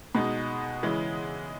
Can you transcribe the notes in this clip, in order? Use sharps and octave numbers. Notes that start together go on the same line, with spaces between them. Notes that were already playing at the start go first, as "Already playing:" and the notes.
B2 G#3 D#4
C#3 E3 G#3